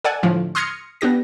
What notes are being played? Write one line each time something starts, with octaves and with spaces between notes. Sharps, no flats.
A4 D5 F#5 G#5
A2 D3 F3
C6 D#6 F6 G#6 A#6 C#7
B3 D4 G4 A#6